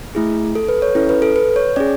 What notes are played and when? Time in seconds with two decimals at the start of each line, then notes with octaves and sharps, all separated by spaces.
0.15 A3 E4 G#4
0.55 A4
0.69 B4
0.82 C#5
0.95 C#4 E4 A4
1.09 B4
1.22 A4
1.36 B4
1.56 C#5
1.76 C#4 G#4 D5